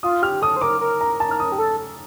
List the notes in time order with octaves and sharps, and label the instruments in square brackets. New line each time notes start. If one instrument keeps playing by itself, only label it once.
[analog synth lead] F4 [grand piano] D#6
[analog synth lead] G4 [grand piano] F6
[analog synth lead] A4 [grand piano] D#6
[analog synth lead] C5
[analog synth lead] A#4 [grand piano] D6
[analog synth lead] A#4
[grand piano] A#5
A5
F6
D#6
[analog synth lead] G4
A4